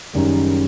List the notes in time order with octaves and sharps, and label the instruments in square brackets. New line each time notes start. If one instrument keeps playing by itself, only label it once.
[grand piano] F#1 F#2 D#3 G3